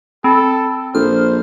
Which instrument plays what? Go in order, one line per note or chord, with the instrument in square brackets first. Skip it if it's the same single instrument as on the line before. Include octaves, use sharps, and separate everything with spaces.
[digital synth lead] C4 [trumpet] A4 [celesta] B5
[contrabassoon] A#1 [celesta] A4 [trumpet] C5 [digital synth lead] F6